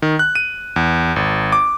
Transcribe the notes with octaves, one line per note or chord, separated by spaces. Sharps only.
D#3
F#6
D#7
E2
G#1
D6